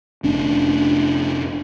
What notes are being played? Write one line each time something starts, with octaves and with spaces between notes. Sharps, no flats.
F1 C#4 D4